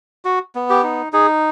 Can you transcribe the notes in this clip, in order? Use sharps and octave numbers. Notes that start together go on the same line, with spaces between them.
F#4
B3
G4
D#4
D#4 G#4